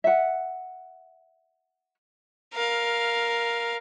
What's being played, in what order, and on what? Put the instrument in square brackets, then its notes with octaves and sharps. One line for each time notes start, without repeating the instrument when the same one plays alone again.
[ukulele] E5 F#5
[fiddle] A#4 F5